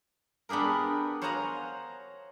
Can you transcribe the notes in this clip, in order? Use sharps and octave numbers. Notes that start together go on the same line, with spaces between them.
B3 D4 G4 G#4 A#4
C5 C#5 F5 F#5 G#5 A#5